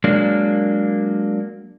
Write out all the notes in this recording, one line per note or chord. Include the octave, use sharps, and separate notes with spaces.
F#3 G#3 A#3 D4